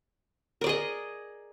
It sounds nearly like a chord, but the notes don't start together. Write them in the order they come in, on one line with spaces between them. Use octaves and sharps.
A#4 D5 G#4 D#5